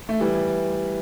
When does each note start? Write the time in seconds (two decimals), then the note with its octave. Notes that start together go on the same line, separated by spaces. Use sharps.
0.09 A3
0.20 E3 G3